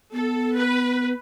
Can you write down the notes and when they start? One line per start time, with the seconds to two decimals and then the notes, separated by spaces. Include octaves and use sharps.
0.13 B3 A4
0.57 B4